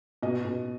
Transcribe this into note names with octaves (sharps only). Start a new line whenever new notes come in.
B2 D#5
B2